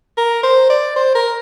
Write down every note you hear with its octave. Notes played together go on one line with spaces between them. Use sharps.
A#4
C5
D5
C5
A#4